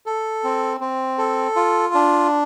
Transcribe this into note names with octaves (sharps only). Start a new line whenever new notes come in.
A4
C4
C4
A4
F4
D4